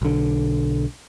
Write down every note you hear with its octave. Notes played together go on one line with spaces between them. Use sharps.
B1 D3